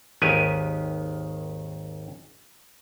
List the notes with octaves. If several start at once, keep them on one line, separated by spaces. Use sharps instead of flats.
G#1 D#2 D#3 G4 B4 G#5